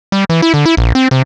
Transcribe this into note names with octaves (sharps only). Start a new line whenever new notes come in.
G3
E3
E4
D3
E4
A#1
C4
C3